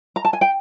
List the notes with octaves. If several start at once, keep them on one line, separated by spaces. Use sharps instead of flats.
A#5
A5
G#5
G5